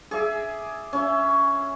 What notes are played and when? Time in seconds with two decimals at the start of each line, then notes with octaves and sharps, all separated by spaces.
0.11 G#4 D5 E5
0.93 C#4 E5